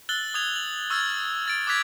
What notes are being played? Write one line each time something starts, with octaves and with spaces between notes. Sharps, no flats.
E6 F#6 A6 F#7 G7
D#6 G#6 F7
F#7
C#6 E6 F6 G#6 A6
F6 A6 D7
D6 D#6 F#6 G#6 B6 F7